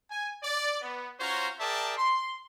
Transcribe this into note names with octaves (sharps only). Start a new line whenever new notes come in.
G#5
D5
B3
C#4 F4 F#4 C5 C#5 A#5
G#4 A#4 D5 E5 G5 A5
C6